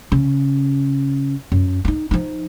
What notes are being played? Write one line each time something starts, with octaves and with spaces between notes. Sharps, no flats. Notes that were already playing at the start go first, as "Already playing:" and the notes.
C#3
F#2
D4 D#4
F3 D#4